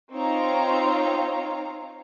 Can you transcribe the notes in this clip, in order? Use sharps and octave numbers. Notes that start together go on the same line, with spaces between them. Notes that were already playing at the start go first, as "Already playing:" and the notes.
C4 D#4 F4 C#5 F5 A#5